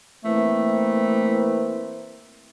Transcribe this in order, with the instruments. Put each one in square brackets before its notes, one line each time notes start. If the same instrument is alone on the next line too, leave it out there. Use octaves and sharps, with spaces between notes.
[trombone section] E3 A#3 C4 [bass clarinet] A3